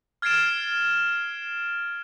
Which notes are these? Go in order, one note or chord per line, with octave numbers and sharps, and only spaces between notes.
F6 G#6 A6 C7 D7 E7